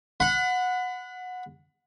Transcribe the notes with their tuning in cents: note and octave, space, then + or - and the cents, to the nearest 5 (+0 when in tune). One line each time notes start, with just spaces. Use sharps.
F#5 -15 B5 +30